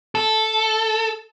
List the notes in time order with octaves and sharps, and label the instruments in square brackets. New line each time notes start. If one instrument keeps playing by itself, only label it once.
[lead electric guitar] A4